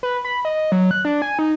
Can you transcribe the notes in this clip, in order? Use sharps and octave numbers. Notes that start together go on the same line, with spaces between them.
B4
B5
D#5
F#3
F#6
D4
G#5
D#4